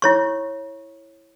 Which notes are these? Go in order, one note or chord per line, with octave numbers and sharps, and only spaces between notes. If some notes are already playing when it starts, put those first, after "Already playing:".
E4 C#5 C#6